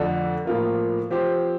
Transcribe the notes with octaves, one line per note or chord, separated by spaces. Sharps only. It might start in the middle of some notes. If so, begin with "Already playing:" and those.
Already playing: F2 D3 A3 D4 A4
A2 F3 A#3 F4 A#4
F3 C4 G4 C5